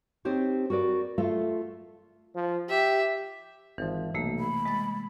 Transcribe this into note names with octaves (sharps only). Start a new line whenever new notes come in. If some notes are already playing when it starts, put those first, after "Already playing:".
C4 D#4 G4 C5 C#5
F#4 A#4 B4 D5
A3 F4 A4 E5 F5
F3
G4 E5
G#1 E3 F3
B1 C3 A3 A#3
B5
G#3 D#5 A6